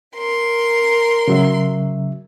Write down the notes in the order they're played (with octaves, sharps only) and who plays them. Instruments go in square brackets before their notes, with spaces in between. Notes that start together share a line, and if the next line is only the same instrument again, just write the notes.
[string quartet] A#4 C6
[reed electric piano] C#3 F#3 E5